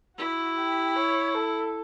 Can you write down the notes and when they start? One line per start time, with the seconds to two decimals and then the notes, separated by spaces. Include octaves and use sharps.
0.18 E4 F#4
0.57 G4
0.96 C#5
1.35 A4